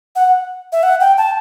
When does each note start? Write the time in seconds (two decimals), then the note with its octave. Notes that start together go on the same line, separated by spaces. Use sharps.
0.16 F#5
0.72 E5
0.83 F#5
1.01 G5
1.18 A5